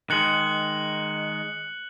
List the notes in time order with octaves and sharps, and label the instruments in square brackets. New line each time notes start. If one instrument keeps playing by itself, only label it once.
[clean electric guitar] D#3 G#3 [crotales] F#6 C#7 F#7